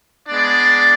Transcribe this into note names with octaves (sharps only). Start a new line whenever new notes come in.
G#3 B3 D4 D5